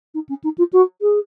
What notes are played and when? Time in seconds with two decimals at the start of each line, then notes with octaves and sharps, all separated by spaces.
0.14 D#4
0.28 C#4
0.43 D#4
0.57 F4
0.72 F#4
1.01 G#4